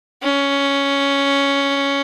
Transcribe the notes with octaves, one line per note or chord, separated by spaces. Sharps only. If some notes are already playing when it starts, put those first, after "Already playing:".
C#4